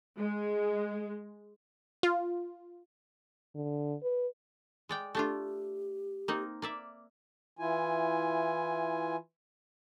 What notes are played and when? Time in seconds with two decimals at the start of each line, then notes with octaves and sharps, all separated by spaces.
0.19 G#3
2.03 F4
3.55 D3
4.03 B4
4.89 G#3 D5 G5
5.15 A3 D4 F4 G4
6.28 A#3 C4 D#4
6.62 A#3 D5 E5
7.59 E3 E4 F4 G#5